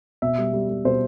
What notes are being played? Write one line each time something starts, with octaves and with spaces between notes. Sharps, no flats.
B2 E5
G3
G3
G3
B2 C5